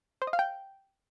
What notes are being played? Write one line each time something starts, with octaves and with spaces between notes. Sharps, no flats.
C5
D#5
F5
G5